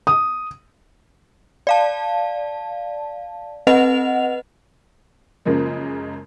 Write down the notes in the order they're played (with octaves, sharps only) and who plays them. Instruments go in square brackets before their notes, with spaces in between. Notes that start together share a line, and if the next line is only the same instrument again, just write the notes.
[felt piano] D#6
[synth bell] D5 F5 A5
C4 B4 D#5 F#5 F7
[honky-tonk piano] F#2 C#3 F3 G#3 A#3